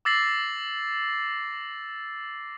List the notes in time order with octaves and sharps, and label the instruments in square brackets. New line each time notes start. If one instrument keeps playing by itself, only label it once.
[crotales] D6 E6 A6 A#6 C7 F#7